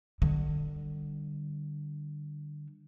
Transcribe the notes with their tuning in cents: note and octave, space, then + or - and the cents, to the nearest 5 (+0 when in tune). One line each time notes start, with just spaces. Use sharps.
D3 +30 G3 +0